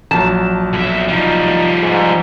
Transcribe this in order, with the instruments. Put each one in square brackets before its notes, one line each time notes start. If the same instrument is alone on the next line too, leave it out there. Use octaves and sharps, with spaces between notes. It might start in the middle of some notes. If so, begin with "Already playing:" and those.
[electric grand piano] A#1 F#3 [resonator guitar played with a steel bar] A5
[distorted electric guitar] B1 E5
[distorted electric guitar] F3 G3 [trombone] D#4
[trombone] G#2